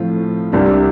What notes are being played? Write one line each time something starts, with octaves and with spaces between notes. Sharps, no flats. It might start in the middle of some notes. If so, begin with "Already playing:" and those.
Already playing: A2 F3 A3 C4 F4
C2 C3 G3 D4